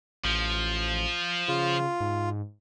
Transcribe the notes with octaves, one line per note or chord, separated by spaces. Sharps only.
A1 F3
C#3 F4
G#2